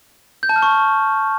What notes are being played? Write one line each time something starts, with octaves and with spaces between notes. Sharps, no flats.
G6
A5
F6
C#6